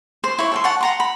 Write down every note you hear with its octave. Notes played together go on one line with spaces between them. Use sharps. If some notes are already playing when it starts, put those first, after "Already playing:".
C5
E4 C#5
A4 F5 C6
C#5 F#5 A5
F#5 A#5 C6
B5